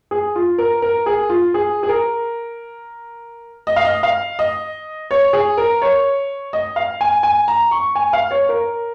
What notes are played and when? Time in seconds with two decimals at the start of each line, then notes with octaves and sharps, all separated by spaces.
0.11 G#4
0.35 F4
0.58 A#4
0.82 A#4
1.06 G#4
1.29 F4
1.54 G#4
1.83 G#4
1.89 A#4
3.67 D#5
3.76 F5
3.85 D#5
4.03 F5
4.39 D#5
5.11 C#5
5.33 G#4
5.57 A#4
5.82 C#5
6.53 D#5
6.76 F5
7.01 G#5
7.23 G#5
7.48 A#5
7.71 C#6
7.95 G#5
8.13 F5
8.31 C#5
8.49 A#4